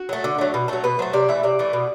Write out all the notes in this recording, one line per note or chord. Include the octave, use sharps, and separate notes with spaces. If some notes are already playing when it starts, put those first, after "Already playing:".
Already playing: F#4
F#3 A3
D3
F#3 A3
B2
F#3 A3 A4
B2 B4
F#3 A3 C5
C3 D5
E3 A3 E5
C3 D5
E3 A3
B2